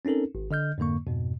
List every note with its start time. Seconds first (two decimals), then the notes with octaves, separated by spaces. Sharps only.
0.05 C4 C#4 D#4 A4 A#4
0.35 G#1
0.51 D3 D#5 F6 G6
0.78 F2 G#2 D3 A#3 C#6
1.07 F2 G#2 B2